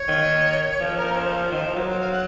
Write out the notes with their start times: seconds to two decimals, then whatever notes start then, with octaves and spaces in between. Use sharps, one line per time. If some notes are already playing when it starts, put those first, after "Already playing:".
Already playing: C#5
0.08 D#3
0.80 F3
0.97 A#4
1.12 C#5
1.16 C5
1.51 D#3
1.64 F3
1.76 F#3 A#4
1.88 C5
1.99 F5
2.11 F#5